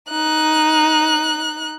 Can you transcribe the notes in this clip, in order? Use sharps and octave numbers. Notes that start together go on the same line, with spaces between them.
D#4 F#6